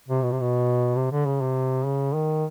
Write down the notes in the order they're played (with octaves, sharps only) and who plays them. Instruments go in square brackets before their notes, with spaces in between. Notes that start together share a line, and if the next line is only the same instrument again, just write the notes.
[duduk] C3
B2
C3
B2
C3
D3
C#3
C3
C#3
D#3